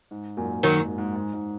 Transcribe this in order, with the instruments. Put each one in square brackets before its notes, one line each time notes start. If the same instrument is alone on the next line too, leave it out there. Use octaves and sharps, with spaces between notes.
[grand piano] G#2
F#2 A#2
[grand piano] F#2 [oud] D#3 F#3
[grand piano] G#2
G#2
G#2
G#2